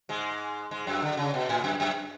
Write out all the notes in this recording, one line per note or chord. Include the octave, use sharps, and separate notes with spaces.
G#2 G#3
G#2 G#3
F#2 F#3
D3
C#3
B2
A2
F#2
F#2